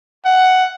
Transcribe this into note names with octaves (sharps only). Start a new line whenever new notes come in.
F#5